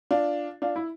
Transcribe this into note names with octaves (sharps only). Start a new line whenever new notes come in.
D4 F4
D4 F4
E4